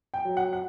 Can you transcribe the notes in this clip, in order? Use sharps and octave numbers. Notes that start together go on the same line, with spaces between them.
G5
F#3
F#5
F#5